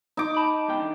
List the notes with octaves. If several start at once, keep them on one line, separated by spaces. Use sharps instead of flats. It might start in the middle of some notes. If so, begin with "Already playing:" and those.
D#4 D6
A5 B5
C#2 B2 G5
E3 D4